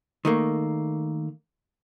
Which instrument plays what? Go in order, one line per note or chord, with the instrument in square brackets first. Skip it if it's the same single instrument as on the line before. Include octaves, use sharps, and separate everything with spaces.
[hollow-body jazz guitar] D#3 A3 A#3